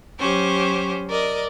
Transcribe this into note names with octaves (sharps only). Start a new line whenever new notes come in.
F#3 C#4 G4 C5
A#4 D5 D#5